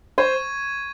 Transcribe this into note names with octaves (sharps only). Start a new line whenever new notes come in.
C5 C#6 G#6 D#7